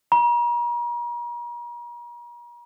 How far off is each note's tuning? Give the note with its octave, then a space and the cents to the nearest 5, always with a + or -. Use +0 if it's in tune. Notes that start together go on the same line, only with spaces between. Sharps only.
A#5 +40